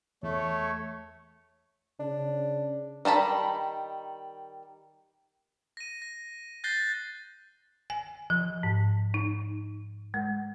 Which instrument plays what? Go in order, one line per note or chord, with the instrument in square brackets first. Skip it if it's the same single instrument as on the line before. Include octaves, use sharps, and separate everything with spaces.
[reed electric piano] E2 [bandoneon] A3 [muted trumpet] C#5
[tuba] C#3 [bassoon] D4
[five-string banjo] D#3 G3 A5 B5
[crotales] A#6 D#7
A#6
F#6 G6 A6 A#6 C7 G7
[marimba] G#5
F3
G#2
D#4
G#3